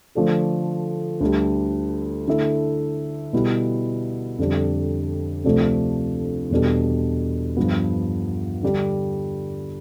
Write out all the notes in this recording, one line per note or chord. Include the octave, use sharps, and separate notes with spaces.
D3 F3 A3 D4 A4
D2 D3 G3
D3 A3 E4 A4 E5
B2 G3 B3 E4
F2 D3 G3 D4
D2 C3 F3 A3 D4
E2 B2 G3 D4 A4
G2 F3 B3
D3 G3 D4